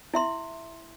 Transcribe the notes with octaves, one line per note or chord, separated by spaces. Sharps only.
E4 E5 C6